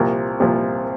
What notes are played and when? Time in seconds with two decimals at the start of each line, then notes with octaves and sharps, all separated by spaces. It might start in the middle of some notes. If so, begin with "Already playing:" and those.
Already playing: C2 A#2 F3 A#4
0.40 C2 A#2 F3